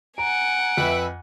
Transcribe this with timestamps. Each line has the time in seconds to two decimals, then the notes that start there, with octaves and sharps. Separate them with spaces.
0.18 F#5 G#5 A#5 D7
0.78 F2 B4 E5